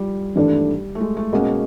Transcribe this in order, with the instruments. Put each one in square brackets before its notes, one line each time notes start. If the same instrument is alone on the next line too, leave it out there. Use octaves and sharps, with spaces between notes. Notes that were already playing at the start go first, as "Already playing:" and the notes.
Already playing: [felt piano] F3 G3
[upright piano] G#1 G2 E3 A3 D4 [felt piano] G3
[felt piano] A3
G#3
A3
[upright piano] B2 G#3 C#4 F#4 [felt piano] A#3